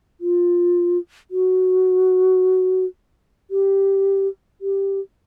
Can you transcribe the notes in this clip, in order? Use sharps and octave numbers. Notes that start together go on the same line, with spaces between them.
F4
F#4
G4
G4